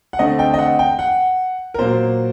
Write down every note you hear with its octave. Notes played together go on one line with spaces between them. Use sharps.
F#5
D3 A3 C4 D#5
G5
D#5
F#5
G5
F#5
A#4
A#2 F#3 A#3 C5